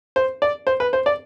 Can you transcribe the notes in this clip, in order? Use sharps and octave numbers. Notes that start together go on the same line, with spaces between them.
C5
D5
C5
B4
C5
D5